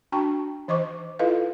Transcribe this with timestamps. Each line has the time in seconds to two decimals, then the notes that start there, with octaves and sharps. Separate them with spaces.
0.12 D4 F#4 G5 A5 C#6
0.68 E3 C5 D#5 C#6 D6
1.19 E4 F4 A4 B4 D#5 F5